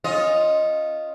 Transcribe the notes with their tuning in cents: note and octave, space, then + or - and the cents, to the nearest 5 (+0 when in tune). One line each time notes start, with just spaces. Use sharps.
C#4 -20 F4 +0 D#5 +0